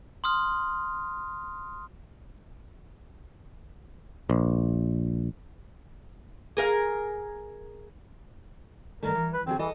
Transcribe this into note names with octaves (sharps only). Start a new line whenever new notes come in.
C6 D#6 F6
A#1
G#4 A#4 F5
G2 D#3 A3 A#4
E3
B4
D3 F#3 C4 G#4
E3 A4 D#5